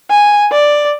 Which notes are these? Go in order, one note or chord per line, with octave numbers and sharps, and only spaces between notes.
G#5
D5